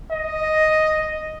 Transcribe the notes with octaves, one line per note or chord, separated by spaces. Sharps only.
D#5